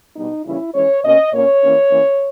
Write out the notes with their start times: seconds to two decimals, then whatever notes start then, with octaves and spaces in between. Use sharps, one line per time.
0.16 B2 G3 B3 D#4
0.44 C#3 E3 G3 A#3 C#4 E4
0.74 E3 G#3 C#4 C#5
1.03 B2 A#3 C#4 D#5
1.33 A#2 A#3 C#4 C#5
1.62 E3 A#3 C#4
1.91 E3 A#3 C#4